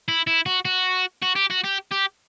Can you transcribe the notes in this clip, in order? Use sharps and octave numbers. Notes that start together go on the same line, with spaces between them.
E4
E4
F#4
F#4
F#4
G4
F#4
G4
G4